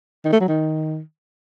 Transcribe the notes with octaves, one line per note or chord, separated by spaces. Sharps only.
D#3
A3
F#3
D#3